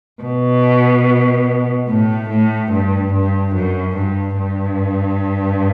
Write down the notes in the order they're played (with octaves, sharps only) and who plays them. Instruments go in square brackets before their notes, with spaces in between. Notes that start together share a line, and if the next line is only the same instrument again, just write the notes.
[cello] B2
A2
A2
G2
G2
F#2
G2
G2